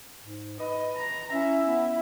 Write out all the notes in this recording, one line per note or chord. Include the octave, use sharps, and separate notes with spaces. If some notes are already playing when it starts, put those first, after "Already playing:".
G#2
B4 D#5
A#5
C#4 E4 E5
B3